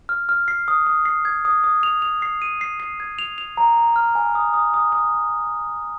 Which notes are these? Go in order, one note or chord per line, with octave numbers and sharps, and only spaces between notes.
F6
F6
C7
D#6
D#6
C7
G#6
D#6
D#6
F7
F7
C7
D#7
C7
C7
G#6
F7
F7
A#5
A#5
F6
G#5
D#6
D#6
D#6
D#6